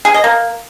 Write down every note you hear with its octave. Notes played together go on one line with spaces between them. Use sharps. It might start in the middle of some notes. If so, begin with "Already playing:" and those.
G#4
D#5
A#3